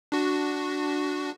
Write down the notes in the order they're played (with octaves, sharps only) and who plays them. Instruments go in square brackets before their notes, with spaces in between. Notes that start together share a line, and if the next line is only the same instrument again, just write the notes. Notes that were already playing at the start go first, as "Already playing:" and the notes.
[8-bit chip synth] D4 F#4